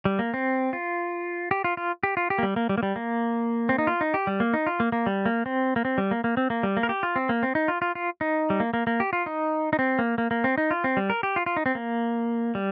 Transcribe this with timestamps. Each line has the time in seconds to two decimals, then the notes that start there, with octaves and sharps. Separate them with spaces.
0.05 G3
0.19 A#3
0.34 C4
0.73 F4
1.51 G4
1.64 F4
1.77 F4
2.03 G4
2.17 F4
2.30 G4
2.38 A#3
2.43 G3
2.56 A#3
2.69 G3
2.78 A#3
2.83 G3
2.96 A#3
3.69 C4
3.78 D#4
3.87 F4
4.01 D#4
4.14 G4
4.27 G3
4.40 A#3
4.54 D#4
4.67 F4
4.80 A#3
4.92 A#3
5.06 G3
5.26 A#3
5.46 C4
5.76 A#3
5.85 C4
5.98 G3
6.11 A#3
6.24 A#3
6.37 C4
6.50 A#3
6.63 G3
6.77 A#3
6.83 A#4
6.89 G4
7.03 F4
7.16 C4
7.29 A#3
7.43 C4
7.55 D#4
7.68 F4
7.82 F4
7.95 F4
8.21 D#4
8.50 G3
8.60 A#3
8.74 A#3
8.87 A#3
9.00 G4
9.13 F4
9.26 D#4
9.73 D#4
9.79 C4
9.99 A#3
10.18 A#3
10.31 A#3
10.44 C4
10.58 D#4
10.71 F4
10.84 C4
10.97 G3
11.10 A#4
11.23 G4
11.36 F4
11.46 F4
11.57 D#4
11.66 C4
11.75 A#3
12.55 G3